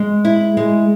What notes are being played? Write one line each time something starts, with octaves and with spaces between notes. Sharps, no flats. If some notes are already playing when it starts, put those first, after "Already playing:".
Already playing: G#3
E4
G#3